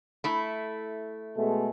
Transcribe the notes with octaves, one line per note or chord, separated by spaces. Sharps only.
A3 E4
B2 G#3 A3